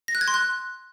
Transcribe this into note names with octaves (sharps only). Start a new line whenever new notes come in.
A#6
F#6
G#6
C6
F#6